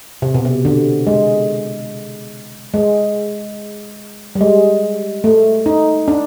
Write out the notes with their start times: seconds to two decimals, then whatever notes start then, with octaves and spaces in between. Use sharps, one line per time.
0.22 C3
0.34 B2
0.45 C3
0.65 D3
1.07 G#3
2.74 G#3
4.35 G3
4.41 G#3
5.24 A3
5.66 D#4
6.08 D4